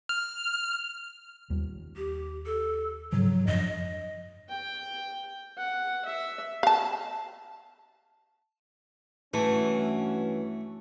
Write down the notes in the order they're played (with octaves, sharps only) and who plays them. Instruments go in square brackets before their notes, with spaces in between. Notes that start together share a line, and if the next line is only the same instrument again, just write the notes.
[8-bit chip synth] F6
[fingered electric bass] D#2 G3
[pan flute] G4
A4
[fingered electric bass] G#2 C#3 F3 [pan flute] F#3
[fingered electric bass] F#2 F3 D4 [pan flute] D#5
[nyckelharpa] G5
F#5
E5
[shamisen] F5 A5
[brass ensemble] G2 C#4 F#4 [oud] E3 [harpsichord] A3